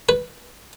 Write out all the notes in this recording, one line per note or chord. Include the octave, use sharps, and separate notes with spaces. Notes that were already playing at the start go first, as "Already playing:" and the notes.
B4